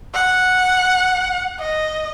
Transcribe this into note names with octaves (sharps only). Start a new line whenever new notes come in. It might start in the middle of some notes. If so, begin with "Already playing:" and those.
F#5
D#5